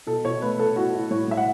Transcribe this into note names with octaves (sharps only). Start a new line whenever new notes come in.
B2 A4
B2 C#5
A3 B4
B2 A4
E4 F#4
E4
A2 C#5
A2 E5
F#5